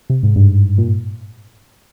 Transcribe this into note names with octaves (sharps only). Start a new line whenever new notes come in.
C3
G#2
G2
A#2